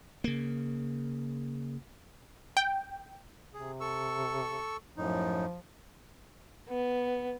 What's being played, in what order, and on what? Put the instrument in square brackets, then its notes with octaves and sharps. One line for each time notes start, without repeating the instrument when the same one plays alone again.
[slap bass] C#3 A#3
[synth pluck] G5
[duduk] C3 [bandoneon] G#4
[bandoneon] A4 C#6 E6
[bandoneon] F#2 A2 D#4 [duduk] F3
[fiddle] B3